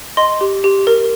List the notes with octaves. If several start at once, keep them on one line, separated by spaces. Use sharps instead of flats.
D#5 C6
G4
G4
A#4